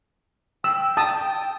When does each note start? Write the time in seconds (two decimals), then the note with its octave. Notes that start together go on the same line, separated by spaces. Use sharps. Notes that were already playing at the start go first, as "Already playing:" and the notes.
0.64 G5 E6
0.97 A5 D#6